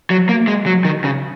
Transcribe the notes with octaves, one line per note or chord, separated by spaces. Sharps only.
F#3
A#3
G#3
F#3
D#3
C#3